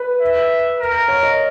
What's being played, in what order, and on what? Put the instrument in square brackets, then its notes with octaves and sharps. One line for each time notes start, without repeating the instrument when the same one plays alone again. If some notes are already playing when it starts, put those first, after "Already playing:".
Already playing: [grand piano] B4
[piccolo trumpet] E5
A#4
[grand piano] C#5
D#5